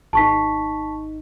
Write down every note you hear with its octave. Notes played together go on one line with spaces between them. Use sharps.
G#1 D#4 A5 C#6 B6